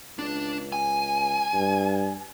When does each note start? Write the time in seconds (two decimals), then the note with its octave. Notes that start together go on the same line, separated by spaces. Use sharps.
0.19 C#2 D4
0.72 G#5
1.53 G2